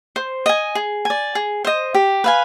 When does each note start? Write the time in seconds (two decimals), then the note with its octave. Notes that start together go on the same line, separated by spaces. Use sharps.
0.16 C5
0.46 D#5 G#5
0.75 G#4
1.05 D5 G#5
1.35 G#4
1.65 C5 D#5
1.94 G4
2.24 B4 F5 G#5